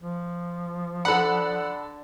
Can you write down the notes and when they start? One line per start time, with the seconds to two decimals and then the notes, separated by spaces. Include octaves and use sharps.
0.01 F3
1.05 D3 A4 F#5 B5